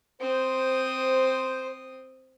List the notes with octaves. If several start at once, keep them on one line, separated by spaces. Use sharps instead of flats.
C4 C5 D#6